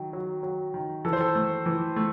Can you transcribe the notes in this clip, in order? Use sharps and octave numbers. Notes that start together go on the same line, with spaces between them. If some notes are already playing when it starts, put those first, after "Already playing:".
Already playing: D#3 F#3
F#3
F#3
D#3
E3 A4
C5
A4
A3
E3
A3